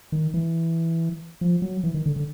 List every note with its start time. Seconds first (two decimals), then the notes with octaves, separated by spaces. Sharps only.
0.12 D#3
0.34 E3
1.41 F3
1.62 F#3
1.84 E3
1.94 D#3
2.06 D3
2.16 D3